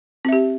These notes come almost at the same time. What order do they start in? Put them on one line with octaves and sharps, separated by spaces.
C4 E5 G4